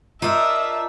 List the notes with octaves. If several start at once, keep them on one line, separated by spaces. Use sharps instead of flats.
D4 D#4 F4 A#4 E5